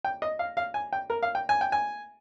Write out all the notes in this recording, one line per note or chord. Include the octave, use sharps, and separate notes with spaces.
G5
D#5
F5
F5
G#5
G5
A#4
F5
G5
G#5
G5
G#5